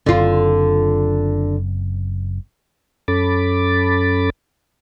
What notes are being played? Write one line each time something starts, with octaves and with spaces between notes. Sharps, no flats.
F#1 F#2 D3 C4 F4
F#2 C#4 A4 B5 D6 A6